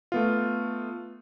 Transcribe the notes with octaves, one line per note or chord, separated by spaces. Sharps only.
A3 B3 F4